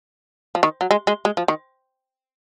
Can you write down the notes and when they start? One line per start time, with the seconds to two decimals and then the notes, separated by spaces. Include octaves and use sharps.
0.55 F3
0.63 D#3
0.81 F#3
0.91 G#3
1.07 G#3
1.25 G#3
1.37 F3
1.48 D#3